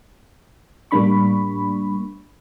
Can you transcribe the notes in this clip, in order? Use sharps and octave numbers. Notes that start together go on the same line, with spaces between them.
A2 G3 A#3 D4 B5 C#6